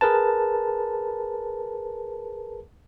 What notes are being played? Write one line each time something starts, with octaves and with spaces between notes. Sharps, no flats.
G#4 A#4 B4 A5